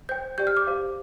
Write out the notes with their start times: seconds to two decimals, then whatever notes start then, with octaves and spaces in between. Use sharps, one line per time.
0.09 C5 G5 G6
0.38 G4 D5 G5 G6
0.47 F6
0.57 D6
0.67 G4 C5 F5